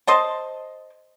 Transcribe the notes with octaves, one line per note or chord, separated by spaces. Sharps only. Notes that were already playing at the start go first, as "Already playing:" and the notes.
C5 D#5 A5